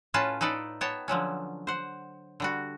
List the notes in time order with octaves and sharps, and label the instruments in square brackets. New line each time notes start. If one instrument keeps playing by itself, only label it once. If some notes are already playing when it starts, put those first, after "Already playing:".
[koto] A2 C#4 F4 B4 A5
D#4 A4 B4 D5
B3 C#5 G5 A5
D3 F3 F#3 C#4
C5 F#5
D3 G3 F#4